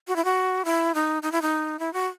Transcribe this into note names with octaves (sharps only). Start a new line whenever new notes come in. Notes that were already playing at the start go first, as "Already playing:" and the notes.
F#4
E4
F#4
E4
D#4
D#4
E4
D#4
E4
F#4